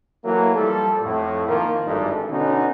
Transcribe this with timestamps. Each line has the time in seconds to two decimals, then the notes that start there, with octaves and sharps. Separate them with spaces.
0.25 E3 F#3 A3 A#3
0.55 F3 G3 A4
1.01 F2 A2
1.48 D#3 F3 A#3
1.86 G#1 G2 E3 D#4 A4
2.29 B2 D3 B3 C#4 D#4